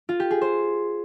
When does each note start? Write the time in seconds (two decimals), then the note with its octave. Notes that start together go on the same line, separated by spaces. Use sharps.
0.09 F4
0.20 G4
0.31 G#4
0.41 C5